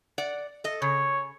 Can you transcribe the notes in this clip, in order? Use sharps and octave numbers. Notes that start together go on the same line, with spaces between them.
D5 F#5
A4 D#5
C#3 C#5